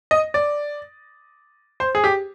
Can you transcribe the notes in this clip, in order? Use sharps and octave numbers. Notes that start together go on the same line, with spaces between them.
D#5
D5
C5
G#4
G4